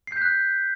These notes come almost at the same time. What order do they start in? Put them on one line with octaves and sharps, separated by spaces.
C7 G6 B6 F#6